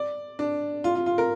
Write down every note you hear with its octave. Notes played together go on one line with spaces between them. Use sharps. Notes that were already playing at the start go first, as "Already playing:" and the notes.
Already playing: D5
D4
F4
F4
F4
A#4